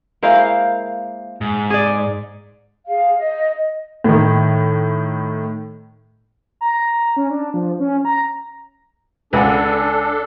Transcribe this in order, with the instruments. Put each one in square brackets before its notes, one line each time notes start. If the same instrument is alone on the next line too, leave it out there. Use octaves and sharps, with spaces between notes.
[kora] G#3 A#3 E4 [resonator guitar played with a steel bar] A#4 C5 F5
[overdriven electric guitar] G#2
[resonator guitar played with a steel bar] G#4 D5
[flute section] G#4 F5
D#5
[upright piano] A2 D#3
[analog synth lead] A#5
C#4
D4
F3
C#4
A#5
[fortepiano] C#2 B4 F#5 [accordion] D4 A4